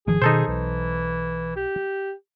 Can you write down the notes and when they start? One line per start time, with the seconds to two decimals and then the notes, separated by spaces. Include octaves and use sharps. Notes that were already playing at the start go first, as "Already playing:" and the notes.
0.07 G#1 D#3 F3 G#4
0.22 B2 D#3 D#4 A4 C5
0.48 B1 E3
1.56 G4